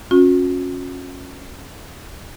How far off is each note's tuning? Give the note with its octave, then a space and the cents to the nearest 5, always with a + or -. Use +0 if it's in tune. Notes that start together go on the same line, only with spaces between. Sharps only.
C#4 -15 F#4 -45